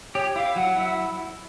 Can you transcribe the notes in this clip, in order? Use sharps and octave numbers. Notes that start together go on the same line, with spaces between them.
G4 C#5
E4 F5
F#3 F#5
E4